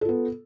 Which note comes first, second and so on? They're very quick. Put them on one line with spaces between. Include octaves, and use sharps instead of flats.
A4 F4 B3